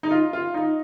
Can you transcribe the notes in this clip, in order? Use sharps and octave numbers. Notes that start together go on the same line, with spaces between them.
D#4
F4
F4
D#4